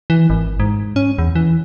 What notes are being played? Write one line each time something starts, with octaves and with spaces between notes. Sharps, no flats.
E3
G#1
G#2
C#4
E2
E3